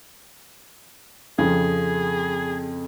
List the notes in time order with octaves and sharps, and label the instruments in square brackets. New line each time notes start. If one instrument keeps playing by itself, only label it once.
[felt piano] F2 C#3 F3 [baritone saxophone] G#4